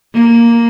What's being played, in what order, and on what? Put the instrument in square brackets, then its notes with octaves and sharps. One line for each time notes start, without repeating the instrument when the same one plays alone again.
[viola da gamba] A#3